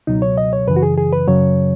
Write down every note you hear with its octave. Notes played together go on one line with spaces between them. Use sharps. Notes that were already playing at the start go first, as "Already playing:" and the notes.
C#2 B2 F#3 D#4
C#5
D#5
C#5
F#2 C#3 E3 B4
F#4
G#4
G#4
B4
F#2 C#3 F#3 C#5